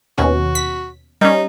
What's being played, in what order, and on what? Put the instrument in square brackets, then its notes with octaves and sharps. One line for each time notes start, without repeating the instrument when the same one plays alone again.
[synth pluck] D#2 B2 C#4 [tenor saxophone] F#4
[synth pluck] B6
[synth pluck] G3 C#4 [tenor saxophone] D#4